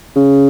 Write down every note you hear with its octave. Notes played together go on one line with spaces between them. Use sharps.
C#3